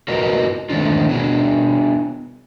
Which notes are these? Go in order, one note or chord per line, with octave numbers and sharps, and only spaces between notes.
F4 F#4 A#4 B4 D#5
D#3 G#3 A3 C4 D4 F4
B3 D4 G#4